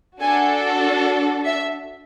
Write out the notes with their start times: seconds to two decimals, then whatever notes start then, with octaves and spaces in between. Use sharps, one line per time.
0.21 D4 F#4 A4 G#5
1.45 E5